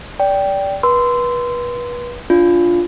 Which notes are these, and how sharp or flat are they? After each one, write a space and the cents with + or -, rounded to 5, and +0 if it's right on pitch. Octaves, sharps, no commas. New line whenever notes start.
D5 -20 G5 +0
B4 -30 C6 -20 E6 +0
D4 -15 F4 +0